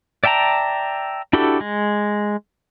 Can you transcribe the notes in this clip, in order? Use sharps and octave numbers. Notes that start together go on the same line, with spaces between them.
D5 E5 G5 A5 A#5
D4 E4 F#4 G4 A4
G#3